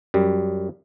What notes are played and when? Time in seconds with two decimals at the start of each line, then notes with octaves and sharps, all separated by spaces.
0.14 F#2 G3